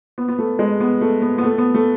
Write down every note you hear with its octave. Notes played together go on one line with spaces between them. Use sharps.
B3
B3
A3
G#3
B3
A3
B3
B3
A3
B3
A3